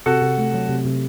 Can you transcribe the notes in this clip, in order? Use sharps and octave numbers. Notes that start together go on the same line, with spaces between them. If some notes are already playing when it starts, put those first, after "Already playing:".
C3 F#4 A4
C3
A3
F#3
C3
C3